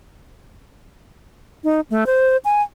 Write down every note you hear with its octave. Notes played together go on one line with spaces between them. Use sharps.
D#4
A3
C5
G#5